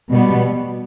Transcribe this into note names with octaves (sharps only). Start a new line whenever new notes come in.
B2 G3 B3